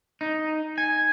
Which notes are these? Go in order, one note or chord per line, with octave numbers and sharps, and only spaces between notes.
D#4
G#5